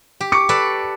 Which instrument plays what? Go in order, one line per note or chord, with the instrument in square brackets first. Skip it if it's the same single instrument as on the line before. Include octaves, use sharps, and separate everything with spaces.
[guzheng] G4
[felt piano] C#6 D6 C#7
[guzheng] A4 B4 D5